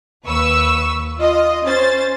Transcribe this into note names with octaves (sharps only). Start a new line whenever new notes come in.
D#2 B4 C#6 E6
F4 D#5
C#4 C5 A6